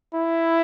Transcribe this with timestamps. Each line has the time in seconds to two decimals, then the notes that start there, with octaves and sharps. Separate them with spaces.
0.14 E4